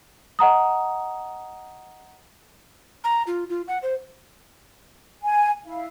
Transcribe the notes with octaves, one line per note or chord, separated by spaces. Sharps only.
D#5 F#5 A#5 D#6
A#5
F4
F4
F#5
C5
G#5
E4 F5